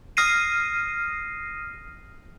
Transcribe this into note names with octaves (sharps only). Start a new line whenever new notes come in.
D#6 F6 A#6 C7 D#7